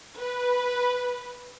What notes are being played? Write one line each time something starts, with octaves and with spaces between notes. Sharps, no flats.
B4